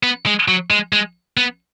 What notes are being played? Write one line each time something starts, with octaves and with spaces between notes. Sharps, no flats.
B3
G#3
F#3
G#3
G#3
B3